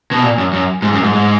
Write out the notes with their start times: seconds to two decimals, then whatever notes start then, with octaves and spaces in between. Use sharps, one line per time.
0.11 B2
0.23 A#2
0.38 F#2
0.53 F#2
0.82 G#2
0.93 F#2
1.03 G#2
1.13 G#2